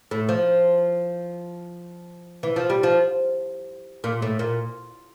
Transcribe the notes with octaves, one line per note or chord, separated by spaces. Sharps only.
A2
F3
E3
F3
G3
F3
A#2
A2
A#2